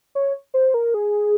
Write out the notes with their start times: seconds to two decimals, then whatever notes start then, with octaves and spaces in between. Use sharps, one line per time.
0.15 C#5
0.54 C5
0.74 A#4
0.94 G#4